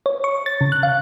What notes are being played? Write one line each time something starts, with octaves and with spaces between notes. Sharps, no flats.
C#5
C#6
A6
C#3
F#6
F5